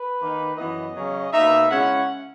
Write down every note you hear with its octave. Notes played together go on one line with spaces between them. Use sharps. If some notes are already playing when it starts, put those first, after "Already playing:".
Already playing: B4
D#3 A#3 D#4
F#2 E3 B3 E4 D#5
C#3 F#3 C#4
B2 A#3 D#4 E5
C#3 G#3 C#4 E4 F#5